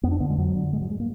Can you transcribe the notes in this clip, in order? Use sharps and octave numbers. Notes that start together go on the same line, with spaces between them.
F2 B3
D4
D3 B3
G#3
F2 F#3
D3
G#2 G#3
F#3
G#3
A#3